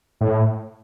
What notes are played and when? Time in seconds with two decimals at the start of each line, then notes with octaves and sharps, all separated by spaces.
0.21 A2